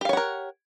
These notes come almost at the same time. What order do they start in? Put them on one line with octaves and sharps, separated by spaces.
G4 F5 C#5 F#5 A#4